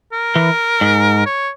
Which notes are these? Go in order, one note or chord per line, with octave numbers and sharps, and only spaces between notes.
A#4
E3
G#2
C#5